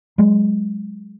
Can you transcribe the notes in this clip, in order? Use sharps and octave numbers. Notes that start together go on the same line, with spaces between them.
F#3 G#3